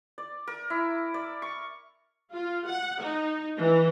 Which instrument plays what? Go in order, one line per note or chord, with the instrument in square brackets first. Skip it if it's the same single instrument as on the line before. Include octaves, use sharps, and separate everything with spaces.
[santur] D5
A#4
E4
D5
C#6
[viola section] F4
F#5
D#4
E3